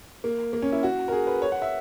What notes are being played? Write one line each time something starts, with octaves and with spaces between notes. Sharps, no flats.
A#3
A#3
C#4
E4
F#4
A#4
G#4
B4
C#5
F#5
E5